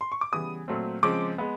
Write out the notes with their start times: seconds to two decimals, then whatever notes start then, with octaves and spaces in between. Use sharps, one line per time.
0.01 C6
0.12 C#6
0.21 D6
0.32 C#3 E3 G3 B3 D#6
0.68 A#2 F#3 A3 C4
1.03 C#3 F3 G#3 C4 D6
1.38 G#3 B3